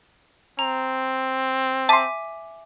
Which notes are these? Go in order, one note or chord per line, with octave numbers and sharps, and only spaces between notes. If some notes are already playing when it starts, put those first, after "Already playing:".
C4 A#5
E5 G#5 A5 C6 D6